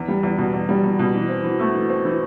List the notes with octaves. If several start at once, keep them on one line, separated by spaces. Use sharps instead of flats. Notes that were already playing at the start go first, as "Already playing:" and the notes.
Already playing: E2
G3
E2
B2
E2
G3
E2
B2
E3
C4
E3
A3
E3
C4
E3